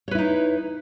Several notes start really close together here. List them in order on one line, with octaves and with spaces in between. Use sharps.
C#5 B4 E4 D#4